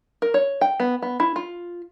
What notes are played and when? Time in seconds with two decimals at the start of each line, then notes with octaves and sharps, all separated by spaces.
0.22 A#4
0.34 C#5
0.61 G5
0.80 B3
1.02 B3
1.20 E4
1.36 F4